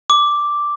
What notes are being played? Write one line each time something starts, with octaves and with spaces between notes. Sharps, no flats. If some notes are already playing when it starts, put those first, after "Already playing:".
D6